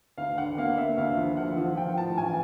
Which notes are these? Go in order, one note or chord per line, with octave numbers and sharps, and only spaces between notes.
D2 F5
D3 F#5
A#3 F5
A#3 E5
D2 F5
F3
D2 F#5
F3
F3 G5
A2 A5
A1 G#5